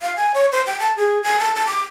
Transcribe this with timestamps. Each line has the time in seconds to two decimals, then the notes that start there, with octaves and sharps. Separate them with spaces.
0.02 F5
0.16 G#5
0.34 C#5
0.52 C5
0.66 G5
0.80 A5
0.97 G#4
1.23 G#5
1.40 A5
1.55 A5
1.67 D6